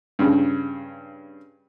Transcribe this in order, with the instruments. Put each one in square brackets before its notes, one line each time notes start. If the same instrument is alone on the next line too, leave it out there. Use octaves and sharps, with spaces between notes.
[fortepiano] G2 C#3